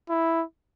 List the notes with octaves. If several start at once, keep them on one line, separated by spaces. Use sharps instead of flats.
E4